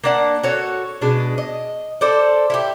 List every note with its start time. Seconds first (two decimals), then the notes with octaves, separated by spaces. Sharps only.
0.04 A#3 D4 F#5
0.43 F#4 A4 C#5
1.01 B2 G#3 D4
1.38 D#5
2.01 A4 C5 D5
2.50 E4 F4 G4